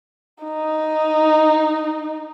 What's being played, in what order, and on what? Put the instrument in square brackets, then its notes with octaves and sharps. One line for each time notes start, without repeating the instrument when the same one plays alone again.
[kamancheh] D#4